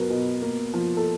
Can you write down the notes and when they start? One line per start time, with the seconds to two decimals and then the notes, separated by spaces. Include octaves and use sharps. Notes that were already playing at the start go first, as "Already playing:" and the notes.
Already playing: B2 F#3 B3 A#4 B4
0.10 B2
0.42 A#3
0.74 F3
0.97 A4